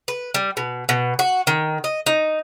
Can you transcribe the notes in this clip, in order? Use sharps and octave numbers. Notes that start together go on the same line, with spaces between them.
B4
G3
B2
B2
F#4
D#3
D#5
D#4